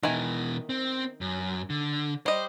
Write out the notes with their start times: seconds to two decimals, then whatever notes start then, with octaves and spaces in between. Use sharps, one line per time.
0.03 B2 D#3 E3 E4 G#5
0.69 C4
1.21 F#2
1.70 D3
2.26 G3 C5 D#5